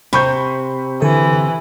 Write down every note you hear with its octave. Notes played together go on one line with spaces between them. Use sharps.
C3 B5 C#6 G6
D3 E3 A4